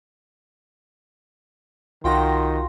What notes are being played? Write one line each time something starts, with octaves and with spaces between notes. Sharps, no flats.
C2 D#3 F4 F#4 G5 C6 A#6